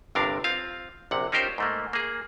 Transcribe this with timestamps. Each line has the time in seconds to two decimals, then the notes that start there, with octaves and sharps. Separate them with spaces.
0.15 G1 G2 C3 D4 A#4 F5
0.44 C4 F4 F5
1.11 A#1 C3 F#5
1.32 C#4 D#4 F4 G4 A#4 C5
1.58 G#2 A3 A#3
1.93 A#3 G#4